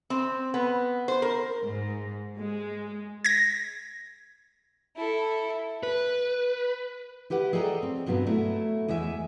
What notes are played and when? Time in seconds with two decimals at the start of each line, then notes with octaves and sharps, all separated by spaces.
0.10 C4
0.54 B3
1.08 C5
1.22 A#4
1.63 G#2
2.39 G#3
3.25 G#6 A#6
4.97 E4 A4
5.83 B4
7.30 E4 G4 B4 F#5
7.53 G#4 A4 D5 D#5 G5 A#5
7.83 C4
8.06 G2 B2 F#3 B3 D4
8.26 F#3 A3 E4
8.88 E2 G#3 C#5 E5 G#5